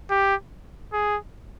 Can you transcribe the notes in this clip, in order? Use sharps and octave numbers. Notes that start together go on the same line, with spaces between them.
G4
G#4